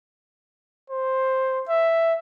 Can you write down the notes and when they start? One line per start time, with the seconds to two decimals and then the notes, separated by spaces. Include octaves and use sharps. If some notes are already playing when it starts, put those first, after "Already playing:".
0.90 C5
1.69 E5